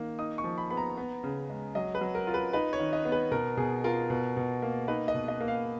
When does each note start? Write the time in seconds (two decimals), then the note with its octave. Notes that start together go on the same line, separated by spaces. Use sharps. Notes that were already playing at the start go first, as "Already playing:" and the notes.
Already playing: D#3 A#3
0.19 D#4 D#6
0.38 C#6
0.44 F3
0.58 B5
0.71 B3 B5
0.77 A#5
0.97 B3
1.24 C#3
1.50 G#3
1.75 F#3 D#5
1.95 B4
2.01 F#3
2.15 A#4
2.27 F4
2.34 B4
2.53 D#4 B4
2.73 C#5
2.80 D#3
2.93 D#5
3.05 B3
3.12 B4
3.32 B2 A#4
3.57 B2 G#4
3.84 F4 A#4
4.10 B2
4.37 B2
4.62 A#3
4.88 D#4 B4
5.08 D#5
5.14 B2
5.28 D#5
5.41 A#3
5.48 F5